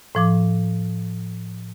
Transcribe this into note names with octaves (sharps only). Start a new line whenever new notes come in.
A2 F3 D6